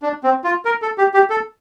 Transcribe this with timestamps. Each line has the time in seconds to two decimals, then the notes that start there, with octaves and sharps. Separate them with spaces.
0.02 D4
0.23 C4
0.44 F4
0.65 A#4
0.82 A4
0.98 G4
1.14 G4
1.30 A4